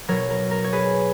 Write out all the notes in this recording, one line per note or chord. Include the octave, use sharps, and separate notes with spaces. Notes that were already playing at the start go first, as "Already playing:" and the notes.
B2 F#3 A#4 C#5
A#4
A#4
C#5
G#4 B4